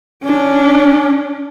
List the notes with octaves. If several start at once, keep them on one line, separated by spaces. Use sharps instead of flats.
C#4 D4